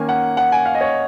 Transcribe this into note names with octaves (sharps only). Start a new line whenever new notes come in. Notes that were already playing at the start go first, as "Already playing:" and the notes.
Already playing: D#3 A#3 C#4 G#5
F#5
F#5
G#5
F5
D#5
C#5